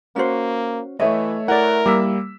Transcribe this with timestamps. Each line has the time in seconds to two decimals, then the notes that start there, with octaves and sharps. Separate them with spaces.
0.16 A#3 C#4 F#4 C5
1.00 E3 A3 C#5 D#5 E5
1.48 E4 A#4 D5 F#5
1.86 G3 A#3 D6 E6 B6